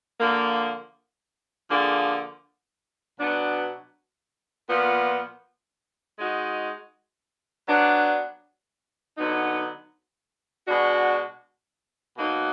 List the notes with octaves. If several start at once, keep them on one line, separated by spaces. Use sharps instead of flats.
D3 F3 A#3
D3 F3 A#3 D4 G#4
B2 F#3 B3 D4
A#2 F3 B3
G#3 D#4 F#4
F#3 B3 D4
D3 F#3 B3 D#4
B2 G#3 D4 F#4
B2 F#3 A#3 D#4